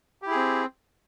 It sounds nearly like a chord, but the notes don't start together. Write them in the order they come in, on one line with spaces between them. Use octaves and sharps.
G4 E4 G#4 C4